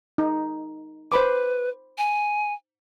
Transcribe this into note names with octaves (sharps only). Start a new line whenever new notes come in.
D#4
B4 C5 B5 D6
G#5